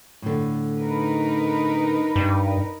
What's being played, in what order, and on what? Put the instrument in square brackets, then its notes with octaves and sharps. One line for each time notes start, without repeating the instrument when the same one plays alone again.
[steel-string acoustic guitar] A2 D3
[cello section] D#4 A#4 B4
[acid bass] G2